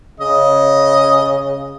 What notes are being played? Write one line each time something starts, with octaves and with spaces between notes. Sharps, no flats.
C#3 D#5